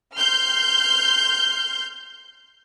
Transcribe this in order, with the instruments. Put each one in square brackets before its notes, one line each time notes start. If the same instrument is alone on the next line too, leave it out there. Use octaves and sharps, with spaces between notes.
[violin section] C6 F6 G6